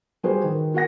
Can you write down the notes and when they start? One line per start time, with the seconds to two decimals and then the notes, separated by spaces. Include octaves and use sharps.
0.23 G3 F#4 G#4 B4 C5
0.43 D#3
0.74 F#4 A#4 F#5 A#6